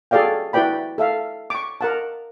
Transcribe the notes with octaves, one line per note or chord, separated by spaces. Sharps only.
F#4 G#4 A4 D5 F5 G5
E4 F#4 B4 D5 G5 B5
A4 E5 F5
C#6 D6
A#4 F#5 A5